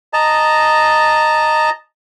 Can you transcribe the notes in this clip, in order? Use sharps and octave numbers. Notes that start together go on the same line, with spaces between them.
D#5 A5 A#5